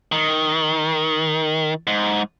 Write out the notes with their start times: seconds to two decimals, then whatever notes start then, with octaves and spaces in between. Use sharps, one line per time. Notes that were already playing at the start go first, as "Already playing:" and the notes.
0.12 D#3
1.87 G#2